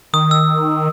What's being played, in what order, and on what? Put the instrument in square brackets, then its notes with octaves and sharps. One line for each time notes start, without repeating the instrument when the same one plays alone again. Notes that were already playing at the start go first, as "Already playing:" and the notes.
[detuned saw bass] D#3 [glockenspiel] D#6
[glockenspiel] E6